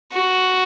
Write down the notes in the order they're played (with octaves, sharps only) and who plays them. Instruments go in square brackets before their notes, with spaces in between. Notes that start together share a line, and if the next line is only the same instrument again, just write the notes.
[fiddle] F#4